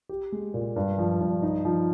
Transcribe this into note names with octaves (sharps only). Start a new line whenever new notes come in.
G4
G#3
A#2
G2
F3
G2
D#4
F3